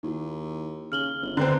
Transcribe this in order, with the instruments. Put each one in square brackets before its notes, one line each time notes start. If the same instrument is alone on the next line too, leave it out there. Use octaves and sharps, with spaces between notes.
[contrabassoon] D#2 [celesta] D#4 E4 F#4
[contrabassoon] C#3 [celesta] F6 F#7 G7
[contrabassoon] G1
[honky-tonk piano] D3 C4 [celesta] B4 A#5